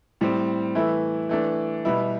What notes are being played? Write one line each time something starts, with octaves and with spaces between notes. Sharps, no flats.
A2 G3 C4
E3 A3 E4
E3 A3 D4
B2 G3 B3 E4